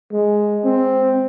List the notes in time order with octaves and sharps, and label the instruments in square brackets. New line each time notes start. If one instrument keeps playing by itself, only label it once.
[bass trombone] G#3
C4